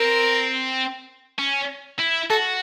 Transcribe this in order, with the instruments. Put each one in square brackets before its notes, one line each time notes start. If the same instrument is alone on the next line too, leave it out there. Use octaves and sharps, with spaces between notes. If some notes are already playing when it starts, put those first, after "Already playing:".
Already playing: [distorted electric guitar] C4 [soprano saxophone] A#4
[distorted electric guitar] C#4
E4
[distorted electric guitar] F#4 [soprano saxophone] A4